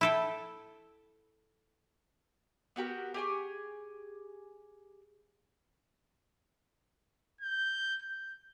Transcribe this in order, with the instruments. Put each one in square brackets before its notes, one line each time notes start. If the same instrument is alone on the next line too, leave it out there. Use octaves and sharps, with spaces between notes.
[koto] E4 A4 G5
[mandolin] B3 F#4 G4 A#4
G4 G#4 G#5 C#6
[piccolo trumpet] G6
G6